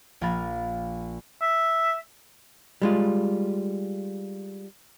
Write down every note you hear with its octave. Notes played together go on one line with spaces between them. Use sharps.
A#1 A#3 B5 A6
E5
G3 G#3 F4